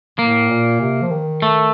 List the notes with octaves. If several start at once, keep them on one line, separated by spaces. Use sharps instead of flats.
A2 A#3
A#2
C3
F3
D#3
A3